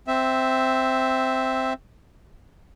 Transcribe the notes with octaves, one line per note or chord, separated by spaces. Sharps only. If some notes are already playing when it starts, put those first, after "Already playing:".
C4 E5